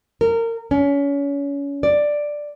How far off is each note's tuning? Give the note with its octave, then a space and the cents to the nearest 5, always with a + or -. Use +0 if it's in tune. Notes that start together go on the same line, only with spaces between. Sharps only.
A#4 -25
C#4 +30
D5 +5